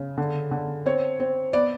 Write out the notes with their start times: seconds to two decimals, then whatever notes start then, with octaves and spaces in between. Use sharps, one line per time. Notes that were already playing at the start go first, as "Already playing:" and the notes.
Already playing: C#3
0.18 D3
0.51 D3
0.86 C4 C#5
1.20 C4
1.53 B3 D5